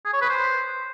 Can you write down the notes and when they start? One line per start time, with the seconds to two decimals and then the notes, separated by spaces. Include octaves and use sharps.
0.05 G#4
0.13 C#5
0.21 B4
0.30 C5